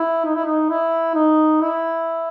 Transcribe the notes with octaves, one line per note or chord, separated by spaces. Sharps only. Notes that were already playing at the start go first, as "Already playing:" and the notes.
Already playing: E4
D#4
E4
D#4
E4
D#4
E4